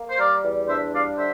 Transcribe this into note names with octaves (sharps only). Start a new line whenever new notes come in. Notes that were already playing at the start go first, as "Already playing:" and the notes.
Already playing: A#3
C5
G3 A#4 D5
E2
D4 C5 E5
G3 D5 F5
D3 C5 E5